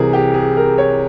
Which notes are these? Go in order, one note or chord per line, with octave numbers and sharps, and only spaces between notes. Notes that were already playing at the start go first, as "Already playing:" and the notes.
Already playing: C2 C3 E3 G#4 A#4
G4
G#4
A#4
C#5